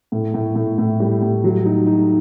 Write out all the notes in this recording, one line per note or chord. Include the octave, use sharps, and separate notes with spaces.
A2
A2
A2
A2
G3
A2
F#3
D#4
D#4